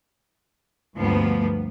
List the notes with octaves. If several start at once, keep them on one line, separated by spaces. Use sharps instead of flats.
D2 G2 F3 G3 A#3 B3